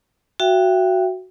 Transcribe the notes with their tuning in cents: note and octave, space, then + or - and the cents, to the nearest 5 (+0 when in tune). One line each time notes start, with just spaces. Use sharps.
F#4 +0 E5 +45 G5 +0